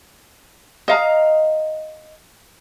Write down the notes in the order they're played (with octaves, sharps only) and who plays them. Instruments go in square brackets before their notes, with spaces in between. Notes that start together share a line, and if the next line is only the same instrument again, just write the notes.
[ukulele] D#5 F5 A#5